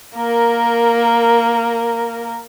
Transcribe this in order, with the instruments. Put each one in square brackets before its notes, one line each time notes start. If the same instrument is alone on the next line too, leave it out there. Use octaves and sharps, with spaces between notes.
[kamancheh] A#3 A#4